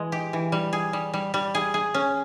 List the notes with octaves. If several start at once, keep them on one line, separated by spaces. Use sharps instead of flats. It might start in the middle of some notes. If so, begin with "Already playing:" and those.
Already playing: E3 G#3
G4
E3
G3
G#4
G3
G3
G3
G#4
G#4
C#4